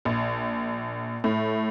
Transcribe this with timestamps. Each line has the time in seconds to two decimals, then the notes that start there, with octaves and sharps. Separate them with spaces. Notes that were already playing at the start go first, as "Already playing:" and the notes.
0.05 A#1
1.24 A2